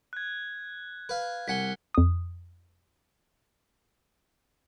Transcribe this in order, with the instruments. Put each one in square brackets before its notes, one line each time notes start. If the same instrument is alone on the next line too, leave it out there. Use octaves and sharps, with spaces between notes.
[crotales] F#6 G#6
[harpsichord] B4 F5
[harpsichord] C2 F#5 G#5 [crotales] B6 C#7 G7
[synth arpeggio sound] F2 D#6